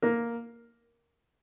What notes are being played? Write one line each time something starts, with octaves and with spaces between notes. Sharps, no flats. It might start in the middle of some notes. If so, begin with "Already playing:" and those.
A#3 A#4